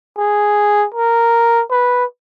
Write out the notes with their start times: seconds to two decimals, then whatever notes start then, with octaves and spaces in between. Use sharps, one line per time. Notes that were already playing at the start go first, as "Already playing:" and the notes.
0.18 G#4
0.94 A#4
1.71 B4